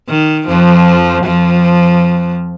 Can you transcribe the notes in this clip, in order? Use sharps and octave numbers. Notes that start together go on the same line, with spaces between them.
D#3
F2 F3
F2 F3